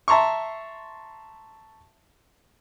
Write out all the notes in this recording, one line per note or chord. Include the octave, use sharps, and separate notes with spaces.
E5 A5 A#5 C6 C#6